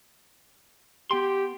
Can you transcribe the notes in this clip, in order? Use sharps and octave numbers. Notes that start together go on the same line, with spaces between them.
B3 G4 G5 C6